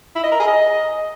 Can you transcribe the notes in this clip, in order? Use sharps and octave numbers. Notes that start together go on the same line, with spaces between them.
E4
D#5
A#4
G#4
D#5